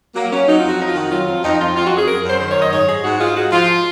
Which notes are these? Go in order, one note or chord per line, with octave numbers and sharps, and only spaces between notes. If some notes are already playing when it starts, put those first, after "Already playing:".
F#3 A#3
F#3 C#4
F#3 D#4
F4
F2
F#4
F2 D#4
F4
D#3 F#4
F#3 F4
F2
F2 D#4
F2 F4
F2 F4
F#4
F2
G#4
F#2 A#4
F#2
C5
D#3 C5
C#5
F#2
D#5
G#2 C#5
G#2 G#4
G#2 F#4
G#3 F4
G#3 F#4
F3 F4